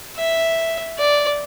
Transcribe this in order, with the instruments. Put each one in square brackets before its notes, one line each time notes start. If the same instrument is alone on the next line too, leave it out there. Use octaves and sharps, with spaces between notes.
[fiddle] E5
D5